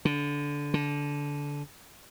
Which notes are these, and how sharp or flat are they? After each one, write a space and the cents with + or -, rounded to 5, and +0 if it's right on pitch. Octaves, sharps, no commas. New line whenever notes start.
D3 -20
D3 -20